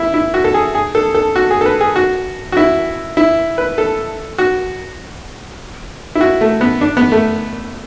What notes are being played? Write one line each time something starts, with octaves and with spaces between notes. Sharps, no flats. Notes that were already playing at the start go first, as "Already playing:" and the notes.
Already playing: E4
E4
F#4
A4
G#4
G#4
A4
A4
F#4
G#4
A4
B4
G#4
F#4
F#4
E4
E4
B4
A4
F#4
E4
F#4
A3
B3
D4
B3
A3